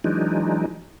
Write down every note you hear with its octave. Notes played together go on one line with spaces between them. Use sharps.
E3 F#3 G#3 D4 D#4